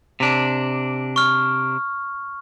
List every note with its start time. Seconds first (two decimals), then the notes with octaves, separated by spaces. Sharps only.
0.20 C3 D4
1.16 C#6 F6